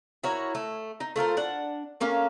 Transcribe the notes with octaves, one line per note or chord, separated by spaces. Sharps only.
E4 F#4 A#4 C#5
A3
D#4
A3 F4 A#4 C5
D4 F#5
A3 A#3 C#4 F5